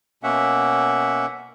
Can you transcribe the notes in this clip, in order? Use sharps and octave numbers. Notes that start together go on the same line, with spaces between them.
B2 A#3 C#4 E5 F#5